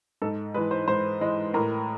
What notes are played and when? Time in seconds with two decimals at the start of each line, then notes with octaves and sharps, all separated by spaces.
0.22 G#2 A4
0.54 E3 G#3 B4
0.71 C5
0.88 G#2 C5
1.21 E3 G#3
1.54 A2 A#4